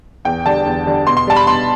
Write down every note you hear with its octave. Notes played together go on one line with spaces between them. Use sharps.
E2 G5
D3 G3 A5
E2
D3 G3
B2 C6
C6
G3 A5
B5
B2 C6